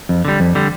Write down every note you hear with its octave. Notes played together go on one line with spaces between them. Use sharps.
F2
D3 G3
F2
D3 G3